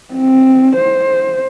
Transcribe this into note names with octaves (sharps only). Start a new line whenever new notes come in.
C4
C5